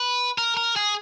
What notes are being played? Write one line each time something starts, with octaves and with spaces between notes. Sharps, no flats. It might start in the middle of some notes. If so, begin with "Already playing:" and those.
Already playing: B4
A#4
A#4
G#4